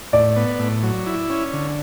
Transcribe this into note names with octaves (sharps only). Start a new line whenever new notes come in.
A2 D5
B3
A2
F#3
E4
C#4
D3